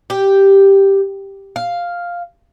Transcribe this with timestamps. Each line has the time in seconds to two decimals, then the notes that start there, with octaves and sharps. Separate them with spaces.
0.10 G4
1.56 F5